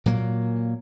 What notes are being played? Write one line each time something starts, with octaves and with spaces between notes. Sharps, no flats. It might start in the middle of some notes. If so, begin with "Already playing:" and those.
A#2 F#3 A#3